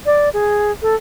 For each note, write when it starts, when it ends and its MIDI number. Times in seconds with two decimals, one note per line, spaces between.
0.06 0.29 74
0.34 0.72 68
0.82 0.95 69